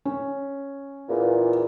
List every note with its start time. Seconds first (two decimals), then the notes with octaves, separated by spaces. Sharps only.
0.05 C#4
1.08 E2 A#2